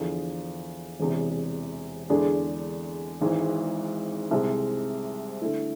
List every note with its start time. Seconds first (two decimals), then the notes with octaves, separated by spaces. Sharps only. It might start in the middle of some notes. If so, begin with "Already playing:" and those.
Already playing: E2 D3 F3
0.99 E1 E2 C3
2.09 E2 D3 G#3 D4 G#4
3.21 G#1 G#2 E3
4.31 C2 C3 G#3
5.42 D3 A3 E4